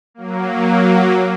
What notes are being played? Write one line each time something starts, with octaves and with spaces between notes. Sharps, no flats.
F#3 A#3